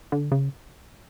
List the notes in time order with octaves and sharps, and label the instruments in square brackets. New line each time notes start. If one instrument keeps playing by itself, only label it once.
[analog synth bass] D3
C#3